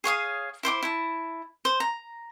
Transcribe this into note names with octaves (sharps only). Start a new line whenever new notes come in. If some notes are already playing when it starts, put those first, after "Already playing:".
G#4 C#5 F5 D#6
E4 C5 G5 D6
E4 A5
C5
A#5